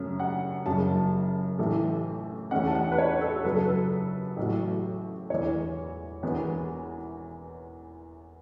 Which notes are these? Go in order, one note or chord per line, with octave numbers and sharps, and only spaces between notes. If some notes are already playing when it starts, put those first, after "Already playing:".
Already playing: F#2 C#3 A3 C#4
F#5
F#1 F#2 C#3 A5
A1 A2 E3 A3
E2 E3 A3 C#4 F#5
A5
F#5
B4
C#5
A4
F#2 C#3 F#3 B4
A4
B4
A1 A2 F#3
E1 E2 E3 C#5
E1 E2 E3 B3